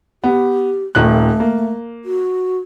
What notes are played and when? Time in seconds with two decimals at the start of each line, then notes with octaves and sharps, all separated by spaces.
0.24 B3 G4
0.95 D#1 D#3 A3 F#6
1.40 A#3
2.05 F#4